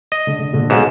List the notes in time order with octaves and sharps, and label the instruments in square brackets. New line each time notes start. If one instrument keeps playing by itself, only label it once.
[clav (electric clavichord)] D#5
[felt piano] D3
D3
A#1 D3
[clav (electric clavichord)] B1 G#2 [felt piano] E7